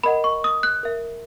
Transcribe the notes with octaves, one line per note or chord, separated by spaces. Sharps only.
A#4 D#5 F#5 B5
C#6
D#6
F#6
A#4 E5